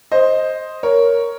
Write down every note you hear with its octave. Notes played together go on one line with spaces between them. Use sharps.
C5 D#5
A#4 C#5